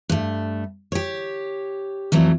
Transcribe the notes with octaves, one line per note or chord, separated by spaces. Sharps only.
G2 A3
G4 C#5
F2 E3 F#3 A3